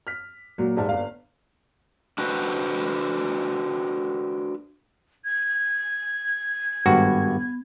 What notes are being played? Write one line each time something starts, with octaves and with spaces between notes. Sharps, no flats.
F6 B6
A#2 F#3
D#1 G#2 D5 E5 A5 F6
G1 D5 F5
D4 F#4 G4 B4 C5
G#6
G#1 G2 B3 F#4